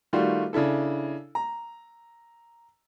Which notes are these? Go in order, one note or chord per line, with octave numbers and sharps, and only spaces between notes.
D#3 G3 A3 F4 F#4
C#3 D4 E4 A4
A#5